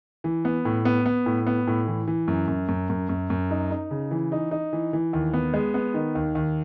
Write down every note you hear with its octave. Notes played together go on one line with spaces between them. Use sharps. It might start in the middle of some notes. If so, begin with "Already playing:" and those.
E3
B3
A2
B3
B3
A2
B3
A2
E3
E3
F#2
F#2
F#2
F#2
F#2
F#2
D#4
D#4
C#3
E3
D#4
D#4
E3
E3
D#2
B3
G#3
B3
D#3
D#2
D#2